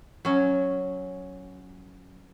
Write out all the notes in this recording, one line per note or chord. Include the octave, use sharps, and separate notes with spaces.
F#3 C#4